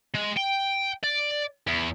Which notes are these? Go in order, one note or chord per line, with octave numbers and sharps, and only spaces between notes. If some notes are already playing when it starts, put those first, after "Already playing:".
G#3
G5
D5
E2